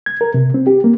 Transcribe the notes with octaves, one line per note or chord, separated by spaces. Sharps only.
G#6
A#4
C3
C4
G4
A#3